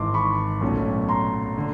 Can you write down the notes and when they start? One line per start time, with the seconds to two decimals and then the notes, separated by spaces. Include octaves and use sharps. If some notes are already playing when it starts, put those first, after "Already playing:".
Already playing: G#1 G#2 E3 C6 D6
0.14 B5 C#6
0.61 B1 A#2 F#3 A3 C#4
1.09 A#5 C6
1.58 D3